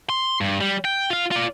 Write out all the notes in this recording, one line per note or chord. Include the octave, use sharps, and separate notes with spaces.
C6
G2
G3
G5
F4 F5
F4 D5